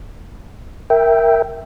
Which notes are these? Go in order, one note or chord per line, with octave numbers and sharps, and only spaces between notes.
A#4 E5 G5